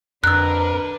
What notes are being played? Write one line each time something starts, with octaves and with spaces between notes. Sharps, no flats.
F2 D3 D4 A#4 B4 E6 F#6